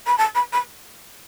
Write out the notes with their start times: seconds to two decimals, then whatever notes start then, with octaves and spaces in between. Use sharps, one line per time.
0.07 B5
0.18 A5
0.35 B5
0.53 B5